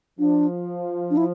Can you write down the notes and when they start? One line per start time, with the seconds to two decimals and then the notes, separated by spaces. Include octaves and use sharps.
0.19 F3 D4
1.10 D4
1.17 E4